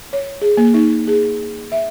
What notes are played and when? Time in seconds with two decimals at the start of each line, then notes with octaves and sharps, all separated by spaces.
0.13 C#5
0.42 G#4
0.57 A#3
0.74 D#4
1.07 G#4
1.72 E5